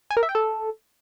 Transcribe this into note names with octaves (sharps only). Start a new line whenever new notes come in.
G#5
A#4
E5
G5
A4